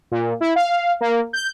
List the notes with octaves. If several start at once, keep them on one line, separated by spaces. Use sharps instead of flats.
A#2
E4
F5
A#3
G6